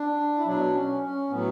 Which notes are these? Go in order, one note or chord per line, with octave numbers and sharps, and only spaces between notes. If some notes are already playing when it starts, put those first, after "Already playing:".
Already playing: D4
E4
B2 F#3 D4
C#4
C#4
A2 F#3 B3